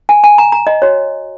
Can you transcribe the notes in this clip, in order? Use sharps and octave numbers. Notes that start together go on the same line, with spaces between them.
G#5
G#5
A#5
A#5
D#5
F#4 C#5